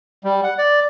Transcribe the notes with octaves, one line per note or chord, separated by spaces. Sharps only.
G3
F#5
D5